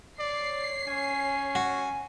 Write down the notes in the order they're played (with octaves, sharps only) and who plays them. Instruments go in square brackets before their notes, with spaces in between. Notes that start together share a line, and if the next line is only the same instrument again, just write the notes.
[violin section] C#5 C7 [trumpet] D5
[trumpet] C#4 [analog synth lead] G#5
[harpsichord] F#4